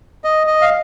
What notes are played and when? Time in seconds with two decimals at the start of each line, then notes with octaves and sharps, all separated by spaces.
0.24 D#5
0.47 D#5
0.62 F5